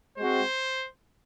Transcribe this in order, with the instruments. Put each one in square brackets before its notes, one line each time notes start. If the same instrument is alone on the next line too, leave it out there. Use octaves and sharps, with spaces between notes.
[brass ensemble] G#3 C4 F#4 [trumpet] C5